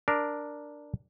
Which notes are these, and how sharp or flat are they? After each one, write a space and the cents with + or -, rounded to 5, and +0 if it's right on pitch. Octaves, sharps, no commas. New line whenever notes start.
D4 +0 A#4 +0